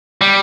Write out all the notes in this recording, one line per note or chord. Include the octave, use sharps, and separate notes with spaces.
G3